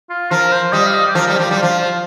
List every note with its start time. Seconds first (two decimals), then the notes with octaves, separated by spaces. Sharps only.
0.10 F4
0.31 F3 A#4
0.52 C5
0.72 G3 D#5
0.87 F5
0.94 D#5
1.06 G4
1.15 F3 A#4
1.27 G3
1.37 F3 G4
1.51 G3
1.57 F4
1.63 F3
1.78 F4